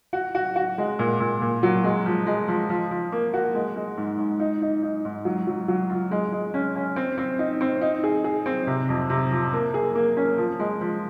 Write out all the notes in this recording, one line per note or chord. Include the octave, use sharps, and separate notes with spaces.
F#4
F#4
F#4
G#3
A#2
A#2
A#2
F#3
G#3
F3
G#3
F3
F3
F3
A#3
F#4
G#3
G#3
G#2
G#2
D#4
D#4
D#4
G#2
F#3
F#3
F#3
F4
G#3
G#3
C#4
C#4
C4
C4
D#4
C4
D#4
G#4
G#4
C4
C3
F2
C3
F3
A#3
G#4
A#3
C#4
F3
G#3
F3